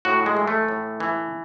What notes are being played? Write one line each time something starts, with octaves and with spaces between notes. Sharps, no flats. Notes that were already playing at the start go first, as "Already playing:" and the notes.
A2 F#4
G#3
E3
A3
A2
E3